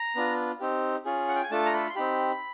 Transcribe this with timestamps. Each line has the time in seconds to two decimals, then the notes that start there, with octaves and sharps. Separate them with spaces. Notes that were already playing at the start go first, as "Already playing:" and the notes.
Already playing: A#5
0.15 B3 D4 F4
0.60 C4 D#4 G4
1.05 C#4 F4 G#4
1.28 F#5
1.36 G5
1.43 G#5
1.51 A3 D4 F4 A4 A5
1.66 A#5
1.74 B5
1.90 C6
1.95 C4 D#4 G4 B5